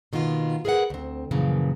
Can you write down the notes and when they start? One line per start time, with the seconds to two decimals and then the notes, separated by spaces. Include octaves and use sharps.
0.13 B2 D#3 A#3 B3 F4
0.65 G#4 A#4 B4 E5 F#5
0.90 D2 C4
1.31 F#2 A#2 C#3 E3 F3